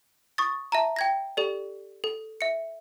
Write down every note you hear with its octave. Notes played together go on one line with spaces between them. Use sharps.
C#6 D#6 A6
E5 A5 A#5
G5 G#6 A#6
G4 A4 D5
A4
E5 C#7